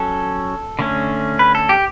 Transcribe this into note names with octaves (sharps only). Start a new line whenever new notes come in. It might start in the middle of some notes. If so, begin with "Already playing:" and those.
Already playing: F#3 C#4 A4
D3 A3 C#4
B4
A4
G4